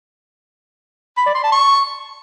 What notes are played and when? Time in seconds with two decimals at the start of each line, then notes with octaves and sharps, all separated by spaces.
1.17 B5
1.26 D5
1.35 C6
1.43 A5
1.52 C#6